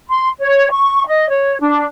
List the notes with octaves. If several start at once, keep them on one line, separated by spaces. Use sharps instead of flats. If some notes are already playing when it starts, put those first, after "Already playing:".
C6
C#5
C#6
D#5
C#5
D4